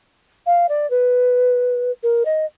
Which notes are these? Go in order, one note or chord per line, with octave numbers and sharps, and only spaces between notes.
F5
D5
B4
A#4
D#5